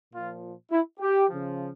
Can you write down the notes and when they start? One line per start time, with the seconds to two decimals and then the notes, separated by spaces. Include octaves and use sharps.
0.14 A#2 F3 F4
0.71 E4
1.00 G4
1.29 C#3 F3